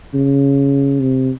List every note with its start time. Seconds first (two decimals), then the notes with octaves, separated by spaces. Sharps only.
0.14 C#3
1.00 C3